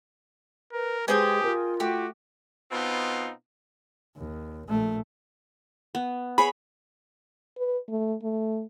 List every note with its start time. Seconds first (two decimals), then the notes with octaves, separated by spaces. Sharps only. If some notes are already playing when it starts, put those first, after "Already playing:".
0.73 A#4 B4
1.08 G#3 G4 G#4 B4 C5 D#5 G5 G#5
1.44 F4 A#4
1.80 A3 F#4 G4
2.71 B2 B3 C4 D#4 F4
4.16 D#2
4.67 A#1 A3
5.95 B3
6.38 G#4 C#5 B5
7.58 B4
7.88 A3
8.23 A3